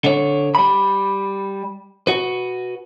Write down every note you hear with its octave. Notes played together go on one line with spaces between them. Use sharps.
D3 C#5
G3 B5
F#4 B4